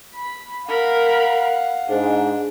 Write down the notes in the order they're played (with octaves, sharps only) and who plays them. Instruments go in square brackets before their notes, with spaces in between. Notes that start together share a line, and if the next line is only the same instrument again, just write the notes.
[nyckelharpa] B5
[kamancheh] A#4 B5 [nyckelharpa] F5 F#5
[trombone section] G#2 [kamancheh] D4